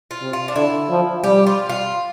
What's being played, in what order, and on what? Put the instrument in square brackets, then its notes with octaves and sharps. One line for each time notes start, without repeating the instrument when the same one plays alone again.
[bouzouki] F4
[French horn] C3
[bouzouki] F4
D4
[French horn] D3 [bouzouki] E4
[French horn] F3
[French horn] G3 [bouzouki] G4
[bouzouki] F4
F4